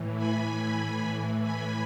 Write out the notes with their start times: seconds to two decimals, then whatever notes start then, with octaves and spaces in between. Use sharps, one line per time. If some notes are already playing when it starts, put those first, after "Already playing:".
Already playing: A2 E3
0.17 G#5 B5
1.42 G#5 B5